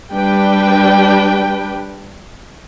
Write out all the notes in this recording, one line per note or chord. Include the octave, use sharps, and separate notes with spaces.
G3 D4 B4 G5